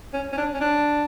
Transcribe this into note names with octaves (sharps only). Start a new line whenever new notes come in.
C#4
C#4
D4
C#4
D4